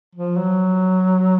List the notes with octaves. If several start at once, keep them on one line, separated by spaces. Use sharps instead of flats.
F3
F#3